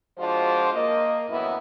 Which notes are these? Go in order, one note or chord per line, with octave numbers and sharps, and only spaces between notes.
F3 G#3 D4 F4 F#4 C5
A#3 D#5
F#2 A2 E3 B3 E4